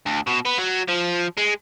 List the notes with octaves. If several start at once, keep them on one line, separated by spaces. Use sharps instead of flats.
D2
B2
B3
F#3
F3
G#3